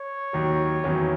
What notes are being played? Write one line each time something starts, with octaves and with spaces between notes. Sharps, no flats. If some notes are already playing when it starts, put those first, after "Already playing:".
Already playing: C#5
D#2 D#3 F#3
E2 D#3 F#3 C#4